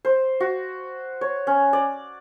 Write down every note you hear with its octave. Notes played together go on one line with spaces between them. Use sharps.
C5
F#4
C#5
C#4
D5